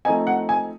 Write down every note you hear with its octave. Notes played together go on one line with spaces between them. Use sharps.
F3 A3 C4 D#4 G#5
F#5
G#5